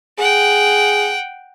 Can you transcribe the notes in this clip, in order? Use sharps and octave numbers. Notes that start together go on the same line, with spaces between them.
G#4 F#5 G5